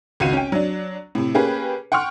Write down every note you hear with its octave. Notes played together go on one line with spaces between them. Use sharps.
G#1 C#2 F#4 F5 D#7
C#4 G5
F#3 D4
A2 C3
A#3 C#4 G4 G#4 B4
F#5 G5 C6 C#6 F6